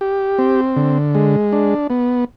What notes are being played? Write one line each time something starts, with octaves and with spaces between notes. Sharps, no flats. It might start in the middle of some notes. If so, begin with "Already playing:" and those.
G4
C4
D3
G#3
D4
B3